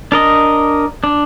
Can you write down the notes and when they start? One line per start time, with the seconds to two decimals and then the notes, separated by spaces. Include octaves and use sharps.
0.12 D4 A#4 D#5
1.04 D4